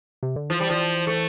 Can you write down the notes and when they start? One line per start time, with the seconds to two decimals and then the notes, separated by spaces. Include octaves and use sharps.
0.23 C3
0.36 D3
0.50 E3 F3
0.60 G3
0.70 F3
1.07 A3